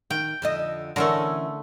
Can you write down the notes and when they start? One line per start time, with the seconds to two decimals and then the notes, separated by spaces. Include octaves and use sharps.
0.10 D#3 G5
0.42 F2 D3 D#5
0.96 D3 E3 A3 C#4 A#4